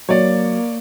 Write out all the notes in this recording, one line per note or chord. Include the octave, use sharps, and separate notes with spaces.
F#3 A#3 C#5 D5